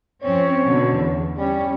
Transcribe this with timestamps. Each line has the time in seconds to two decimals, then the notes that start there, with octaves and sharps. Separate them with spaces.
0.24 F2 C4 C#4 C#5
0.67 B2 D3
0.96 E2
1.38 G3 C#4